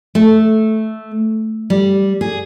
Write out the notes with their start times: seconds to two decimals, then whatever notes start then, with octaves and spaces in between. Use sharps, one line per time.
0.15 A3
1.70 G3
2.21 G#4